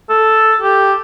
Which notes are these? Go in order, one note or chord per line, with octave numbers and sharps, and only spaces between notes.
A4
G4